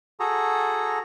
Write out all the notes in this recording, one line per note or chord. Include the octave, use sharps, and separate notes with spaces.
F#4 G#4 A4 A#5